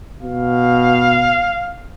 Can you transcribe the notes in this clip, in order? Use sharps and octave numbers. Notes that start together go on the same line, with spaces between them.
B2 F5